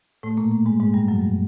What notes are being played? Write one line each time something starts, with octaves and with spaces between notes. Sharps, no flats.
A2 A3
A#2 A#3
A2 A3
G#2 G#3
G#2 G#3
G2 G3
F#2 F#3
G2 G3